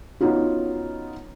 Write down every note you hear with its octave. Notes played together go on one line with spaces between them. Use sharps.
B3 C#4 D#4 F4 F#4